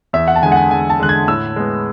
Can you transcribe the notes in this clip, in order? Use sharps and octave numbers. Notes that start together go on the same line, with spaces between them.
E2 E5
F#5
A5
D3 G#3 G#5
F#5
G#5
E2 G#5
A5
D3 G#3 F#6
G#6
A2 E6
G#3 B3